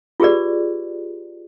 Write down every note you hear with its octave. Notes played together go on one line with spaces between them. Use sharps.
F4 G4 G#4 B4 D5